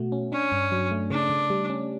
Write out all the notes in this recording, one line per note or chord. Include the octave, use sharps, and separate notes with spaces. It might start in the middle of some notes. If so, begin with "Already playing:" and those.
Already playing: B2 A3 F#4
C#4
C#4 D4
G2
F#3
A3
C#3 D4
C#3
G3
C#4